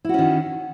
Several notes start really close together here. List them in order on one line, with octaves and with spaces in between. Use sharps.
E4 F#4 C#4 D#3